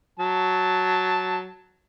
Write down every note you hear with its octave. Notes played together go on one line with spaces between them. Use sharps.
F#3 A5